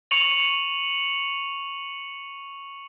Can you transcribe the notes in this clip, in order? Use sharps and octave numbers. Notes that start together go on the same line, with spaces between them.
C#6 C#7 D#7 F7 F#7